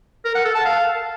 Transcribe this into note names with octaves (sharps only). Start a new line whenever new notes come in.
A#4
F#5
A4
A5
F5